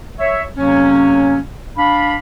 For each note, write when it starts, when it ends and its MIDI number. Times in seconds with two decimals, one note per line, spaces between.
0.19 0.42 73
0.19 0.42 76
0.56 1.39 41
0.56 1.39 48
0.56 1.39 54
0.56 1.39 58
0.56 1.39 61
1.77 2.15 62
1.77 2.15 77
1.77 2.15 83